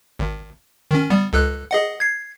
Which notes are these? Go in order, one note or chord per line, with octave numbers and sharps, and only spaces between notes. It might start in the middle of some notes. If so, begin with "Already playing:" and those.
G#1
D#3 C#4
G3 B3
C#2 A4 F#6
G#4 D#5 F#5
G#6 C7